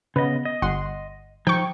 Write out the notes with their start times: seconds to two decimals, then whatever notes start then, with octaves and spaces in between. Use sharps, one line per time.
0.16 C#3 B3 D#5
0.45 D#5
0.62 G1 F#5 C6
1.47 F3 D#4 G5 C#6